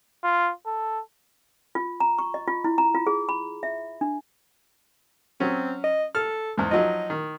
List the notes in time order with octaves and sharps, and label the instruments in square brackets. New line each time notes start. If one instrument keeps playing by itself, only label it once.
[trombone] F4
A4
[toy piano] F4
A#5
C#6
D#5
F4
E4
A#5
F4
G#4
B5
E5
D4
[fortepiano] F#3 C#4 [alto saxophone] C4
[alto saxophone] D#5
[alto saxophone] A4 [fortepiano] F6
[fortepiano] E2 G#2
[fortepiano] F3 F#3 D#4 [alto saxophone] D#5
[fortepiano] D#3